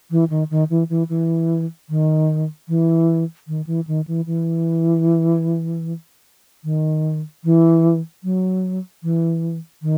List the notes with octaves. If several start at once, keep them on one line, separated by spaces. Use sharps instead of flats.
E3
D#3
D#3
E3
E3
E3
D#3
E3
D#3
E3
D#3
E3
E3
D#3
E3
F#3
E3
D#3